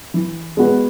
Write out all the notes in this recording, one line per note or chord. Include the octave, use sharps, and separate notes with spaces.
E3
G#3 B3 F#4 B4